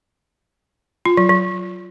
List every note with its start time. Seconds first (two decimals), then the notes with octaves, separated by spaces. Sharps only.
1.06 F4
1.17 F#3
1.29 F#3